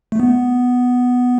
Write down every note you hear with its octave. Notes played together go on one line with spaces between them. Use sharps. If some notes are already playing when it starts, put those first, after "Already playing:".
A3
B3